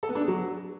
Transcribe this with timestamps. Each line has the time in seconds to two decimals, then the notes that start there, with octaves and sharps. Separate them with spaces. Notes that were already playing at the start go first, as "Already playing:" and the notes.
0.03 A4
0.09 B3
0.15 D4
0.22 G#4
0.28 F#3